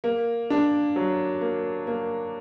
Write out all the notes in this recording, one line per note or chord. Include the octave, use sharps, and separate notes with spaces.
A#3
D4
F#3
A#3
A#3